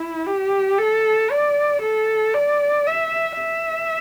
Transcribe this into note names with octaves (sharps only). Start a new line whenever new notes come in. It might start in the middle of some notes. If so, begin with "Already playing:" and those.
Already playing: E4
G4
A4
D5
A4
D5
E5
E5